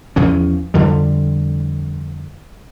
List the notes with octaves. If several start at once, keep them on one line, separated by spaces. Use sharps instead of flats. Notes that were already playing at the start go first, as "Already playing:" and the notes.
E2 F3 C#4
F2 D3 G3